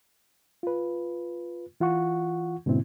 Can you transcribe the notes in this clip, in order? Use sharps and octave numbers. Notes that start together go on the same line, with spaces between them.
F4 B4
E3 F4 F#5 C#6
G#2 B2 D3 A#3 C4 E4